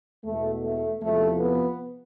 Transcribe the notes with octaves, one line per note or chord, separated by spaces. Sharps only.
E2 B2 A3
A3
E2 C3 F3 A3
B3